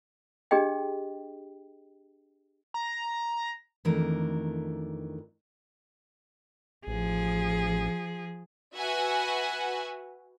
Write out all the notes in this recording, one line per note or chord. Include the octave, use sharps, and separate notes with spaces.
D4 G4 G#4 D#5 G5
A#5
F2 D#3 E3 A3 D4 A#4
A1 F3 G#4
F#4 B4 E5 F#5 G#5